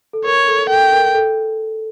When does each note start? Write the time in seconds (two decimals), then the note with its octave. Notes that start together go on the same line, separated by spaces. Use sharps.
0.13 A4
0.25 A#4 C#5
0.48 A4
0.70 A4 G5
0.93 A#4
1.15 A4